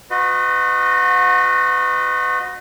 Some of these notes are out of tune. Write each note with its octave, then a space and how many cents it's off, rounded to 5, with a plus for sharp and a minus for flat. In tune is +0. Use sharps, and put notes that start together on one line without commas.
F#4 -30 B4 +35 D#5 -10